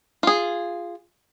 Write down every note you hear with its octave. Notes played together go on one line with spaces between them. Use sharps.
F4 G#4